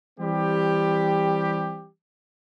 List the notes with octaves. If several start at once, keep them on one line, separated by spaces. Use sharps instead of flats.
E3 G3 C4 G4